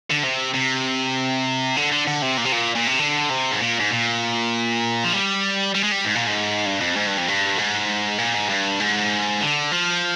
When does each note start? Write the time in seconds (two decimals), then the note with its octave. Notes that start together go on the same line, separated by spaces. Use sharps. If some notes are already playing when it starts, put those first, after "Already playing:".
0.11 D3
0.24 C3
0.54 C3
1.76 D3
1.92 D3
2.07 D3
2.22 C3
2.38 A#2
2.45 C3
2.52 A#2
2.76 A#2
2.87 C3
2.99 D3
3.30 C3
3.51 G#2
3.60 A#2
3.80 G#2
3.91 A#2
5.04 F3
5.13 G3
5.74 G3
5.83 G#3
5.91 G3
6.05 G#2
6.15 A#2
6.27 G#2
6.66 G2
6.81 F2
6.96 G#2
7.07 G2
7.18 F2
7.28 G2
7.58 G#2
8.18 A#2
8.35 G#2
8.49 G2
8.80 G#2
9.41 D3
9.72 F3